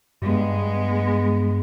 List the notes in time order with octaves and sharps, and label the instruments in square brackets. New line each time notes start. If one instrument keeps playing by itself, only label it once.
[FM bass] G2 [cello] G#3 B3